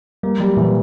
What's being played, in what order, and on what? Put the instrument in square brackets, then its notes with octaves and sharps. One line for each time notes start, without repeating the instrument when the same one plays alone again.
[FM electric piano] G3 [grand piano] A#3
[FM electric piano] F#3 [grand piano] G3
[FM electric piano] A#2 [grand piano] E3